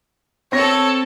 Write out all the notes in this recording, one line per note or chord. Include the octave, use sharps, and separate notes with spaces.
C4 A4 C#5 A#6